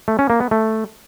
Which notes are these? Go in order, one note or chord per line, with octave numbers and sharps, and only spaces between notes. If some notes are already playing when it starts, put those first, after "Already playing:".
A3
C#4
A#3
B3
A3